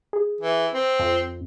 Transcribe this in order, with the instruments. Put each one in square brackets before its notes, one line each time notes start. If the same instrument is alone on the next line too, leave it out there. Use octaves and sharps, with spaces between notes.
[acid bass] G#4
[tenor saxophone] E3
C4
[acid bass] F2